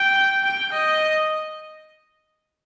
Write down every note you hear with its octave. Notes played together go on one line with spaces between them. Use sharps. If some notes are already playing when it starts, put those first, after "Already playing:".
Already playing: G5
G5
D#5